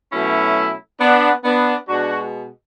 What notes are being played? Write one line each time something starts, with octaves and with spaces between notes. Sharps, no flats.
B2 F#3 A3 C#4 E4
B3 D4
B3 D4
B2 G#3 D4 F#4